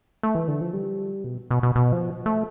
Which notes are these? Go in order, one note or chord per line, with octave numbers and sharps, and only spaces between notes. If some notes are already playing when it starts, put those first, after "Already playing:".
A3
E3
D3
F3
G3
B2
B2
B2
B2
F3
A3